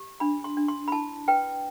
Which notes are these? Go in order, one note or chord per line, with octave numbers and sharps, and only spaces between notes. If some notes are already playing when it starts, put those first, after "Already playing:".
Already playing: G4
D4 B5
C6
D4
C6
B5
E4 A5
B4 G5